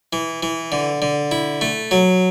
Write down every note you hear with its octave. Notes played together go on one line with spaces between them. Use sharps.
E3
E3
D3
D3
E4
A3
F#3